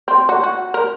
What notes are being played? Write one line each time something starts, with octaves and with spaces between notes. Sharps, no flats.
C4
F#4
F#4
A#4